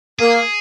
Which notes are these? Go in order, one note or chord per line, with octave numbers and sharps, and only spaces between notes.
A#3 G#4